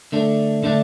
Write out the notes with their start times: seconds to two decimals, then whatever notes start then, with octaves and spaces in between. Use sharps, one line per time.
0.12 D3 A3 D4
0.64 D3 A3 D4